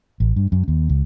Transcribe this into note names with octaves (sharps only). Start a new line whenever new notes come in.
A1
G2
F#2
D#2
C#2